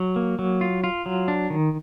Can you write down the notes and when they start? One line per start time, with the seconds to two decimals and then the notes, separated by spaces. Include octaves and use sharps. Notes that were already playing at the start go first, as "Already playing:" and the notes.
Already playing: F#3
0.16 A#3
0.39 F#3
0.61 F4
0.84 F4
1.06 F#3
1.28 D4
1.50 D#3